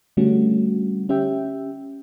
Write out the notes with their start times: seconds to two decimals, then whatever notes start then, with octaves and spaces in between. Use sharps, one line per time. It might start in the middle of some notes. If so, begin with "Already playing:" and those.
0.17 D3 G3 A3 C#4 F#4
1.09 C#4 G4 E5 G5